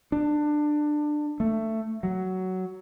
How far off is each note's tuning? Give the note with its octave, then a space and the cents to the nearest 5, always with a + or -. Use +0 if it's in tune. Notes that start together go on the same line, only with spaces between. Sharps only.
D4 +20
A3 +15
F#3 +10